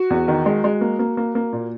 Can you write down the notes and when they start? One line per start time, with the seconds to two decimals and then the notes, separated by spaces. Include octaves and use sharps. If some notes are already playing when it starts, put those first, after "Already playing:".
Already playing: F#4
0.10 E2
0.28 D#3
0.46 G#3
0.64 G#3
0.81 A#3
0.99 A#3
1.17 A#3
1.35 A#3
1.53 A#2